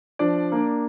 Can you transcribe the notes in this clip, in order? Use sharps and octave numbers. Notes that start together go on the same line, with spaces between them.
F3 D4 D5
A#3 D4